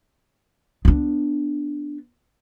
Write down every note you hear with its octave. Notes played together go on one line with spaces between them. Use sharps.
B3 D4